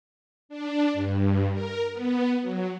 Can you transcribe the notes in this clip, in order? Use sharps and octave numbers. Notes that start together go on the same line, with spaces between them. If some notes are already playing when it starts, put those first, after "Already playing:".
D4
G2
A#4
B3
F#3